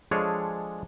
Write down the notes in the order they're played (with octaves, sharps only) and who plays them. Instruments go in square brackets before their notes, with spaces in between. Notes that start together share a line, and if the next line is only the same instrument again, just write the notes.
[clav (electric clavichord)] F3 G#3 D4 G#4 A4 C#5